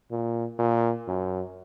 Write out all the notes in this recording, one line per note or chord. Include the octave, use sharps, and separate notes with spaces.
A#2
A#2
F#2